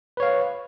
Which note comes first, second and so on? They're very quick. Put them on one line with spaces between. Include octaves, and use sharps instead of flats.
B4 C#5 F5